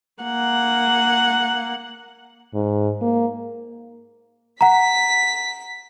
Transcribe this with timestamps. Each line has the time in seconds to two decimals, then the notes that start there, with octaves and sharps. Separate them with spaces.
0.23 A#3 F#5
2.54 G#2
3.01 A#3
4.61 F#5 A#5 B6